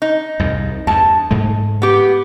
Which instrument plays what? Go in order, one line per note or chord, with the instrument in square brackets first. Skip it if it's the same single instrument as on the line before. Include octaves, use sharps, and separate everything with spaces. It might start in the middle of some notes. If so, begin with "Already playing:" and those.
[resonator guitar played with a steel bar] D#4
[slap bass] C2 F2 G#2
[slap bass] E2 G2 [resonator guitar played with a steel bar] A5
[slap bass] G#2 G#3 A3
[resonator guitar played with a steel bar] B3 G4